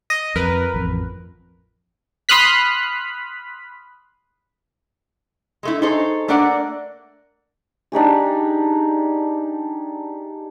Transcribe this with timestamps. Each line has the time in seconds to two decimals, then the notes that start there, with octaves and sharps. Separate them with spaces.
0.10 D#5
0.36 F2 A#4 B4
0.74 A1 F2
2.29 B5 C6 D#6 F6 F#6 B6
5.63 G#3 A3 E4
5.82 D#4 G#4 A4 C5 C#5
6.28 A3 A#3 D4 D5 F#5
7.92 D4 D#4 G4 G#4